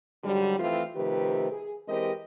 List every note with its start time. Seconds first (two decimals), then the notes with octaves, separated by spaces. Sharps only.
0.23 G#2 D3 F#3 G3
0.59 E3 F3 A3 C4 F4
0.96 C3 D#3 F3 A3 G4 B4
1.51 G#4
1.87 E3 G#3 C4 G4 A#4 D#5